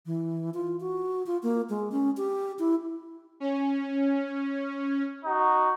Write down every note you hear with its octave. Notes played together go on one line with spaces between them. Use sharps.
E3
F4
F#4
F4
A#3
G#3
C#4
G4
E4
C#4
D#4 F#4